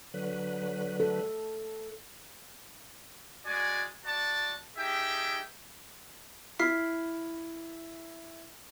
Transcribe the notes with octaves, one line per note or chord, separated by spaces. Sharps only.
D3 F#3 B4
A4
G#3 F#4 D5 G#5
F#4 D5 A5
D#4 G4 G#4 E5 G5
E4 F6 B6 C7